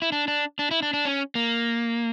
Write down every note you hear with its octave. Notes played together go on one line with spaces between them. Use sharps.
E4
D4
D4
D4
E4
D4
D4
C#4
A#3